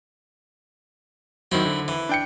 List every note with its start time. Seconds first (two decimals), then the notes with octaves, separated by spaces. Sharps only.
1.52 D#3 F#3 C4 E4
1.65 D3
1.88 E3
2.09 D4 G5 C#7